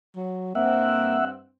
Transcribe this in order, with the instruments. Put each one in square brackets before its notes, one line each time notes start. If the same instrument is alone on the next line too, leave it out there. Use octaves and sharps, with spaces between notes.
[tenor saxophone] F#3
[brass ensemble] G2 C4 [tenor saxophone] A#3 [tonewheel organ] E5 F#5